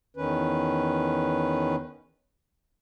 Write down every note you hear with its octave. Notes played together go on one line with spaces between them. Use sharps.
E2 D#3 C#4 B4